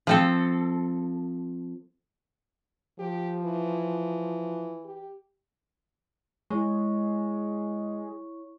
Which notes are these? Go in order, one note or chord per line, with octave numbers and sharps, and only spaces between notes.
F3 C4 A4
F3 G4
E3
G4
G#3 E4 C#5 C#6